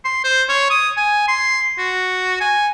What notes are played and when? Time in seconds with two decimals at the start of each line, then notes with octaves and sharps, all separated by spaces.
0.05 C6
0.24 C5
0.49 C#5
0.70 D#6
0.97 G#5
1.28 C6
1.78 F#4
2.40 G#5